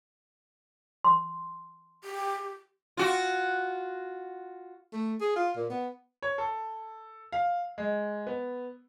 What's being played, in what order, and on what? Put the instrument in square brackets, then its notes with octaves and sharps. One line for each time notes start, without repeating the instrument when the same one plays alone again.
[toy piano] C6
[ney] G4
[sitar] F4 F#4
[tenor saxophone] A3
G#4
F4
A#2
B3
[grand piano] C#5
A4
F5
G#3
B3